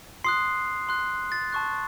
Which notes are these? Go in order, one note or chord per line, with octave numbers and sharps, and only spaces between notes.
C6 D#6 F#6 C7
C6 F#6
A6
A5 C#6 F#6